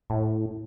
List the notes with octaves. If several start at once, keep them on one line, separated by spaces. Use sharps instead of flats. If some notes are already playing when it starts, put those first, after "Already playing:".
A2